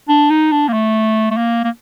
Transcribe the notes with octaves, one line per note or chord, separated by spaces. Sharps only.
D4
D#4
D4
A#3
A3
A3
A#3
A#3